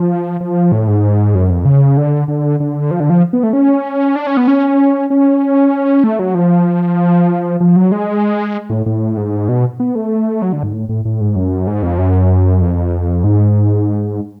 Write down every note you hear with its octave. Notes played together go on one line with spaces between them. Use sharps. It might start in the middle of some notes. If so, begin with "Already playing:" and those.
Already playing: F3
F3
A2
G#2
F#2
F2
C#3
D3
D3
D3
F3
D3
F3
B3
A3
C#4
D4
C#4
B3
C#4
C#4
A3
F#3
F3
F3
F#3
G#3
A2
A2
G#2
B2
B3
A3
F#3
D3
G#2
A2
A2
A2
G#2
F#2
G#2
F2
F#2
F2
G#2